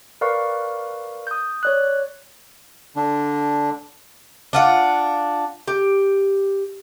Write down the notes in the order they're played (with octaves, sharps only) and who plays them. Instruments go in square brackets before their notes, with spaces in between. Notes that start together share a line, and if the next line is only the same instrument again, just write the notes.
[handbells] A#4 B4 D5 F5 C#6
D#6 G6
C#5 D5 F#6
[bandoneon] D3 D4
[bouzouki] D4 F4 F#5
G4